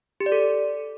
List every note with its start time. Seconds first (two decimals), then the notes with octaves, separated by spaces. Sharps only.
0.20 G4
0.26 D5
0.32 A4